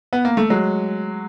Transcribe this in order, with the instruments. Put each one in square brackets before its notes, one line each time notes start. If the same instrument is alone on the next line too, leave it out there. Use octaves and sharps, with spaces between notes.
[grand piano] B3
A#3
A3
F#3 G#3